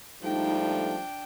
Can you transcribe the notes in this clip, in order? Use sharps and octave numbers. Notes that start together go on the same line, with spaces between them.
G#2 F3 G3 A3 D4 D#4 G5